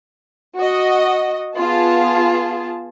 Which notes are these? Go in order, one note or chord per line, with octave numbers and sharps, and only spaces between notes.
F#4 D#5
B3 F4 G#4 A5